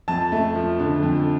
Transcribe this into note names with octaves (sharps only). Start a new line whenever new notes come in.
F2 A5
A3
F3
D3
F2